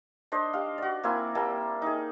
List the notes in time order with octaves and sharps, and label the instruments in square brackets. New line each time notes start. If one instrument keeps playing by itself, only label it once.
[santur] D4 C5 D#5
G4 F5
F#4 D5
A#3 C4 E4 G#5
G3 A#3 G5 A5
D#4 G#4